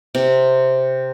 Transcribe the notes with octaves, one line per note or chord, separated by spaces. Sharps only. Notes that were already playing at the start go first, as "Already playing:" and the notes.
C3